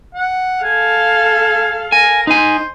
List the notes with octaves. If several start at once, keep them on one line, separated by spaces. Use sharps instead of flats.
F#5
A4 F5 G#5
A#4 G#5
D#4 C5 G#5